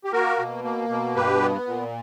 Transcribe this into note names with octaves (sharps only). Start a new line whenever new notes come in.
G4
A#3 F#4 A#4
B2
A#3
B2
G2 G4 B4
B3
A#2